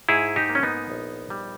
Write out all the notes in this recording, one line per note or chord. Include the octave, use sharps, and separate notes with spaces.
G#2 E4 G#4
D#4 G4
A#3
C#4
B3 D#4
A#1
G3